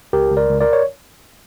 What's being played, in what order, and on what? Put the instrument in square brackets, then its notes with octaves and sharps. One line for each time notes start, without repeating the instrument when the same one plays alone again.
[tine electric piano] C#2 G4 A#4
C#2
A#4 D5
C#2
A#4 D5
C#5